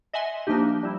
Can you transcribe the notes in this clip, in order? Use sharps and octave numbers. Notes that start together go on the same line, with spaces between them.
D#5 E5 F#5 G#5 C6
F3 A#3 D4 D#4 G4
G3 E4